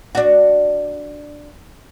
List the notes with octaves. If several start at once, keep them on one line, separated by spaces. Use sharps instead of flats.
D4 F#4